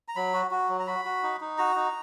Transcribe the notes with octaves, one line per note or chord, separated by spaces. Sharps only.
A#5
F#3 B5
F#4
F#4
F#3
A#5
F#4 B5
F#4
D#4
D#4
F#4 A#5
D#4